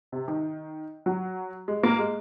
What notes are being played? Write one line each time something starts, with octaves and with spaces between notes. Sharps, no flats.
C3
D#3
F#3
G#3
A#3
G#3